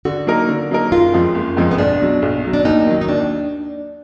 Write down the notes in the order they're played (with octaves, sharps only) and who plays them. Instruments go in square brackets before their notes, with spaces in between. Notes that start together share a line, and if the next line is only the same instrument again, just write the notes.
[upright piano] D3 [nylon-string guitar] F#4
[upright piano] F#3 A#3 D#4 A#4
D3
F#3 A#3 D#4 A#4
[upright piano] F#1 [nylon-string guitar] F4
[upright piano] F2 F3 G#3
F#1
F2 F3 G#3
[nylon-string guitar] B3
[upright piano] B1 [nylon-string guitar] D4
[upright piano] B2 F#3
B1
B2 F#3
[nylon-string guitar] D4
[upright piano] D#2 [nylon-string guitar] D#4
[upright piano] D#3 F#3
[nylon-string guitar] D#4
[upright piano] D#2 [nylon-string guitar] D4